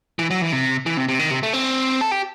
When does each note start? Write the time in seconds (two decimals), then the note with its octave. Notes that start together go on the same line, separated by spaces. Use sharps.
0.19 E3
0.31 F#3
0.41 E3
0.52 C3
0.86 E3
0.97 C3
1.08 C3
1.19 D#3
1.31 C3
1.43 A3
1.53 C4
2.01 A4
2.11 G4